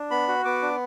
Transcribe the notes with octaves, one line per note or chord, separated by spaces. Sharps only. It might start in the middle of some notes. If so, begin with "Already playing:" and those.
Already playing: D4
B3 B5
F#4
B3 D6
D4